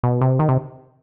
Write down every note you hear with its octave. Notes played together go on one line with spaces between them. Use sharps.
B2
C3
D#3
C3